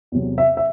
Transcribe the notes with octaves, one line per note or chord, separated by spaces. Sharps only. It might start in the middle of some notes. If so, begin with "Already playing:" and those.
E2 C3 F#3
E5
E5